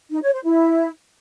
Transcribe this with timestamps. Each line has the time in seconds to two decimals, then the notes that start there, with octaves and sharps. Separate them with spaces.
0.11 D#4
0.22 C#5
0.33 C5
0.44 E4